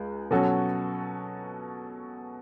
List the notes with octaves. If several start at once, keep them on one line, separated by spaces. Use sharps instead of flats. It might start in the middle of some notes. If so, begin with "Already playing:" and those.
Already playing: C#2 G#3
B2 F#3 C#4 F#4 A4